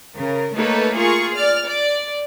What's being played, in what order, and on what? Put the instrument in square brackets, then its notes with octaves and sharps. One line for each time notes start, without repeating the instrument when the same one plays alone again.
[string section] C#3 A#4
A3 A#3 D#4 A4 B4 C#5
F4 G#4 A#4 C#6
D5 F6
D5